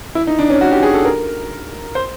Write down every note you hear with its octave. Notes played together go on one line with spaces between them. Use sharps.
E4
D#4
D4
C#4
F#4
G4
G#4
A4
A#4
C5